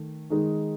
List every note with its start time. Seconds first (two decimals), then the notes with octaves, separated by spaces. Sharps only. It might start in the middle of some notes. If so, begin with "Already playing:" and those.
Already playing: D#3 A3
0.30 D#3 G#3 D#4